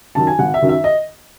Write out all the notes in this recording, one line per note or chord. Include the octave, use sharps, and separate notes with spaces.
F#2 D#3 F#3 A5
G#5
G#1 F#5
E5
F#2 D#3 F#3
E5
D#5